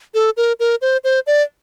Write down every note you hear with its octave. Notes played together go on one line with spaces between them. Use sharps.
A4
A#4
A#4
C5
C5
D5